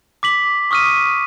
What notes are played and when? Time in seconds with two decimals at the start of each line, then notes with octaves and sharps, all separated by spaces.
0.23 D6 B6 F#7
0.71 C#6 D#6 F6 B6 D#7